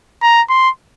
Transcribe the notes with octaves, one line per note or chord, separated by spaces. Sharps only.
A#5
C6